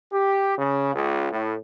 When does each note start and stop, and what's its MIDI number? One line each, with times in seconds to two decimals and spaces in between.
0.12 0.54 67
0.58 0.92 49
0.94 1.28 37
1.32 1.55 45